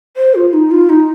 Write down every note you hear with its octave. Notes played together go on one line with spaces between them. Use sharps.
C5
F4
D#4
F4
D#4